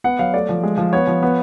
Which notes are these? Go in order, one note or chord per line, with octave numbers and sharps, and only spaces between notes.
B3 F#5
F#3 F5
A3 D5
F3
G#3
F3
B3 C#5
F3
B3